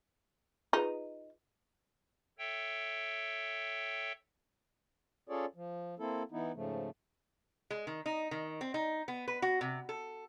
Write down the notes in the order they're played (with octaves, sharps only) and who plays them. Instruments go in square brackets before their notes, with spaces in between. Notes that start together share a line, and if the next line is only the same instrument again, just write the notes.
[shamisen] D#4 [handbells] F4 G#4 B4
[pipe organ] A4 C#5 E5 G5
[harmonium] C#4 F4 G#4 A4 C#5 D5
F3
A#3 C4 E4 A4
E3 B3 D#4 E4
G#2 C#3 F3 A3
[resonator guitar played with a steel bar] G#3
D#3
D#4
D#3
C4
D#4
B3
B4
F#4
C3
A4